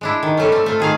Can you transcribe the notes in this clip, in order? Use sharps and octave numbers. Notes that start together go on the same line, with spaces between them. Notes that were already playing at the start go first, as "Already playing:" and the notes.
G#3 D4 E4
D#3
G3 A3 C#4
C4 A4
A3 F4
D#3 G#4 F5